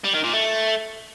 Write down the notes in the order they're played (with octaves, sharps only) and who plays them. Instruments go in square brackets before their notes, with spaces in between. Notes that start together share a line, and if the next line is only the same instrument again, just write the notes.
[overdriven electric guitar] G3
D#3
A#2
A3